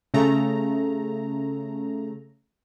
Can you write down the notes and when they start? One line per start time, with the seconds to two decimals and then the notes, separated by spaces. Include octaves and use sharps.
0.14 C#3 A3 A#5